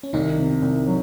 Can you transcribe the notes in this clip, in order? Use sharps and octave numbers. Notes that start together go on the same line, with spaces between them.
C#4
C2 D#3 D#4
C3
C2
F#3